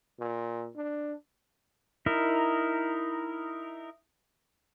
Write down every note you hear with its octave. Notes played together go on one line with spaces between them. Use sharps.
A#2
D4
D#4 E4 A#4